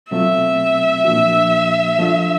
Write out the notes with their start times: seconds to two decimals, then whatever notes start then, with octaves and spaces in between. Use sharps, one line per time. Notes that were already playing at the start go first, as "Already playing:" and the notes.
0.11 B2 F#3 A3 C4 F4 E5
1.04 A#2 F3 A#3 D4 F#4
1.99 F3 A3 D4 F4